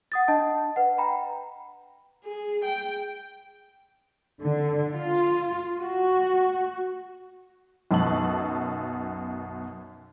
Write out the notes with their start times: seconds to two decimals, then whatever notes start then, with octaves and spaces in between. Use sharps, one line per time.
0.12 F#5 D#6 A6
0.28 D4 D#5 A5
0.76 B4 F#5
0.98 G5 A#5 B5
2.24 G#4
2.64 G5
4.41 D3
4.93 F4
5.80 F#4
7.91 B1 F#2 B2 A5 F#7